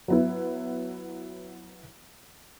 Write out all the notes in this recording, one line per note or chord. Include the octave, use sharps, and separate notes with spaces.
F#3 B3 E4